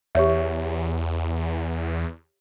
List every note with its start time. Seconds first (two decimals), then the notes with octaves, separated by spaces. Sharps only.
0.15 E2 G4 C#5 E5